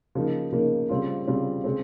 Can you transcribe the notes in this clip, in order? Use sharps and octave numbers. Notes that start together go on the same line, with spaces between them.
C#3 F3 A#3 D#4
C#3 F3 A#3 D#4
C#3 G3 C4 F4
C#3 G3 C4 F4
C#3 G#3 C4